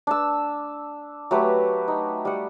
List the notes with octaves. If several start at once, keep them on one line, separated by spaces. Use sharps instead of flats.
D4 E6
F#3 A3 G4 B4
D#4
G3 F#5